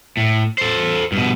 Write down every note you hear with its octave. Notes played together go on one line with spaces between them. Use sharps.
A2
A4 C5
G2 B2